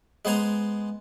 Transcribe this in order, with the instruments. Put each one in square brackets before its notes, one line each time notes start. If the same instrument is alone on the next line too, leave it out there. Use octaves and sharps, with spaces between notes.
[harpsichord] G#3 B3 C5 G#5 A#5